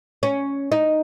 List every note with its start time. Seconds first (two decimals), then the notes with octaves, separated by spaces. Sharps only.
0.23 C#4
0.72 D#4